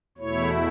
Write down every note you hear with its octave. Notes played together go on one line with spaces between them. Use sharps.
E2 B2 A3 E4 C#5